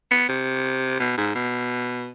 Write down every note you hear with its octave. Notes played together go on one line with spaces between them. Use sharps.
B3
C3
B2
G#2
B2